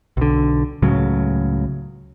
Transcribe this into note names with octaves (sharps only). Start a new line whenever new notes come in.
B1 D3
C#2 A2 C#3 F#3